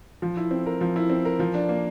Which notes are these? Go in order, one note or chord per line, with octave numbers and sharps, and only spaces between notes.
F3
E4
C4
A#4
F3
E4
C4
A#4
F3
D4
A#3